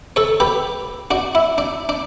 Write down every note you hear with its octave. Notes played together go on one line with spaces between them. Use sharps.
A4 C#5
G4 B4
D4 F#4
E4
D4
D4